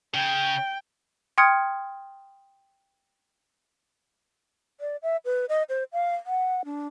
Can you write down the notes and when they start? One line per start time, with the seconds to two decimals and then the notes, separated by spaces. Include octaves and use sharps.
0.14 C#3 G5
1.38 G5 C6 D#6 F6 G#6 C#7
4.80 D5
5.03 E5
5.25 B4
5.49 D#5
5.69 C5
5.93 F5
6.26 F#5
6.65 D4